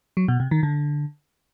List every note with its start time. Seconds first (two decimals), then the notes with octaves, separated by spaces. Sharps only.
0.17 F#3
0.28 B2
0.40 C3
0.51 D#3
0.63 D3